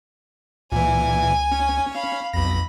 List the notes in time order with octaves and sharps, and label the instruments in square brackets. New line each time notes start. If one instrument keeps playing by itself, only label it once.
[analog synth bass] C#2 [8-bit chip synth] A#2 E3 [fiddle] G#5
[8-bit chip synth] C#4
[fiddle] F5 B5
[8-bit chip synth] B1 A#6 [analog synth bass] F2 [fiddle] B5